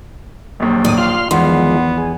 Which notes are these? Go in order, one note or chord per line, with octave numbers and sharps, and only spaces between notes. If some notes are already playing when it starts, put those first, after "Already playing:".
A#1 D#2 F#3
A2 D#3 D5 D#6
F4 C6 F6
E2 D#3 F3 G#3 B3 C6
G#4